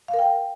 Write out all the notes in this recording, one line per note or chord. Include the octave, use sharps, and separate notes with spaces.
F5
A#4
G5